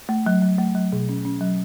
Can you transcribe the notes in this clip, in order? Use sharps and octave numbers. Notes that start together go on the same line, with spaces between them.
A3
F#3
F#3
A3
F#3
B2
C#4
C#4
F#3